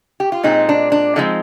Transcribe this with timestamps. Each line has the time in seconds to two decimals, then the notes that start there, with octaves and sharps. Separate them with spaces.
0.20 G4
0.32 F4
0.43 A#2 G#3 C4 D#4
0.69 D4
0.92 D4
1.16 D3 F3 G#3 C4 D#4